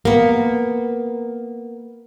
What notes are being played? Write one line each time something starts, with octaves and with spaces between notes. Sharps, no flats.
A#3 B3